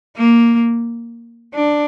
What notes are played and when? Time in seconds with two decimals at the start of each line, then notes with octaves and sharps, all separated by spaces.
0.17 A#3
1.54 D4